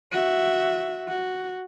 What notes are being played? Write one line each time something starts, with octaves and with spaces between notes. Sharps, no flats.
F#4 E5
F#4